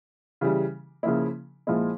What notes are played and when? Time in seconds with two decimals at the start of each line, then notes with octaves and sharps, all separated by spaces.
0.41 C#3 E3 G3
1.03 C#3 F3 A#3 E4
1.67 A#2 F3 G#3 E4